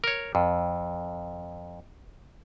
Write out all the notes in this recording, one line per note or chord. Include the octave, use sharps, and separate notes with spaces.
A#4 C#5
F2